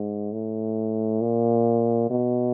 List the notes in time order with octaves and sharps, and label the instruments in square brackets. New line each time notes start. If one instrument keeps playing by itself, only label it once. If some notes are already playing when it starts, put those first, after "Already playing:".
Already playing: [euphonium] G#2
A2
A#2
B2